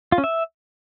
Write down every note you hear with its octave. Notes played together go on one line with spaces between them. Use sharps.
F4
C#4
E5